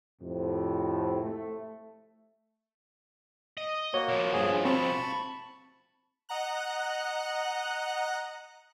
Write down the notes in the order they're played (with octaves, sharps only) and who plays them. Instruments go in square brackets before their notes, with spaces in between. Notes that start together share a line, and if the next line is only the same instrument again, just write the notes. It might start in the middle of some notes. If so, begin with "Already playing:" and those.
[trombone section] F2 A2 C3
A3
[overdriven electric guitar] D#5
[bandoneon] A#3 F#4 [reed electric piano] C#5
[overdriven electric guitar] B2 F3
[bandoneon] G2 G#4
[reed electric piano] C4 [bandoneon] A5 B5 C#6
[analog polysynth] D#5 F#5 A#5 F#6